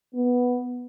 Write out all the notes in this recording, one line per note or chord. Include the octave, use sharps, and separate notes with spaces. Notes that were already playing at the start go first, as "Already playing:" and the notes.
B3